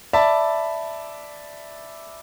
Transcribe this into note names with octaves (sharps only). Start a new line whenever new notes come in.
D5 E5 A5 B5